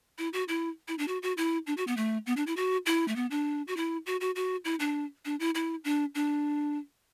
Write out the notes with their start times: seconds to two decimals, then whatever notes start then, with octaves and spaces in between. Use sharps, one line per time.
0.18 E4
0.33 F#4
0.48 E4
0.88 E4
0.98 D4
1.08 F#4
1.23 F#4
1.37 E4
1.67 D4
1.77 F#4
1.87 B3
1.97 A3
2.26 B3
2.37 D4
2.47 E4
2.57 F#4
2.86 E4
3.08 A3
3.16 B3
3.31 D4
3.67 F#4
3.76 E4
4.06 F#4
4.21 F#4
4.36 F#4
4.65 E4
4.80 D4
5.25 D4
5.40 E4
5.55 E4
5.84 D4
6.15 D4